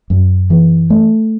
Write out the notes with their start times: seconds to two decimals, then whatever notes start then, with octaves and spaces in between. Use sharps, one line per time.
0.10 F#2
0.50 E3
0.90 A3